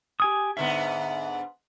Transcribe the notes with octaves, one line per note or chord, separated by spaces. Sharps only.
G4 G#5 D#6
G#2 D3 B3 E5